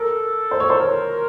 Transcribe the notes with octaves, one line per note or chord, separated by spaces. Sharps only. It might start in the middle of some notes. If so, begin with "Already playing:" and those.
Already playing: A4 A#4
C5
C#5
C5
A#4